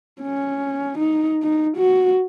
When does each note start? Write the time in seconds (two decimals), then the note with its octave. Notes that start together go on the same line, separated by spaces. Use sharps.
0.22 C#4
0.98 D#4
1.43 D#4
1.77 F#4